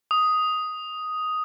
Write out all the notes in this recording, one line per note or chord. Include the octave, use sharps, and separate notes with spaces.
D#6